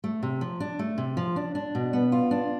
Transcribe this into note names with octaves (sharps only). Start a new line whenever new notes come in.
A3
C3
F3
D4
A3
C3
F3
D4
D4
B2
B3
F4
D4